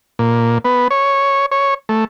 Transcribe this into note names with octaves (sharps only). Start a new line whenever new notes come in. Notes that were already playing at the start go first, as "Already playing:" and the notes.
A#2
B3
C#5
C#5
A3